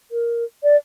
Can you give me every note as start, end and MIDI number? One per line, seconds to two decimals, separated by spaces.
0.11 0.44 70
0.63 0.76 74